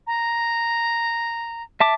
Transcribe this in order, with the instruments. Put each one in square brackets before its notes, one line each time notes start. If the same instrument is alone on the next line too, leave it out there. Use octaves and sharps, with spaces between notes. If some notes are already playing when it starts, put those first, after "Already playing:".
[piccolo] A#5
[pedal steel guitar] E5 A5 D6